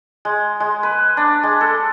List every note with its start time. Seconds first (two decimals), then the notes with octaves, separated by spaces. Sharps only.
0.25 G#3
0.60 G#3
0.83 B4
1.17 D4
1.43 G#3
1.61 A4